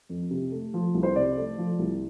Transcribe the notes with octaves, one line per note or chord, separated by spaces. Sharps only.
F2
C3
A3
F3
C2
C5
C3 D5
A3
F3
C2